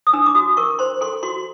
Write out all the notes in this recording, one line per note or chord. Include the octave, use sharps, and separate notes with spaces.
D#6
D4 E6
D6
F#4 D#6
A#4 C#6
C5 C6
A4 C6
F#4 C6